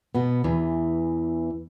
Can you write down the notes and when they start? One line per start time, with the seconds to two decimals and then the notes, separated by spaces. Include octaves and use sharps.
0.15 B2 B3
0.44 E2 E3